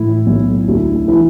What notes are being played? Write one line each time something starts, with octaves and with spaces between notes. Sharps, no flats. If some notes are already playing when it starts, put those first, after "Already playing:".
Already playing: A2 E3 E4
B1
D2
E3